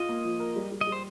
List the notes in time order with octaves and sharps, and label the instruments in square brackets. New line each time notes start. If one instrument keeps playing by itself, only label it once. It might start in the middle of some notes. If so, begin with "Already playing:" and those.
Already playing: [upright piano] F4 [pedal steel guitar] D#5
[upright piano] A#3
F3
A#4
G3
G3
[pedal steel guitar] D#5
[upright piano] G3
[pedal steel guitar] C5